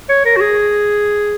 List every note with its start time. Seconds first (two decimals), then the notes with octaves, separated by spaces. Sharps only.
0.09 C#5
0.25 A#4
0.36 F#4
0.41 G#4